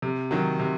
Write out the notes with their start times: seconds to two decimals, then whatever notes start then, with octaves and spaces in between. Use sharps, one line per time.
0.02 C3
0.31 D#3 F#3
0.59 C3